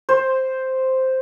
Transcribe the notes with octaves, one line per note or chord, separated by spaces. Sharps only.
C5